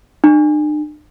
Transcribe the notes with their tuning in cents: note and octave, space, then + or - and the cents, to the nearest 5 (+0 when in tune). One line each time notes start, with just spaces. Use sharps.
D4 +45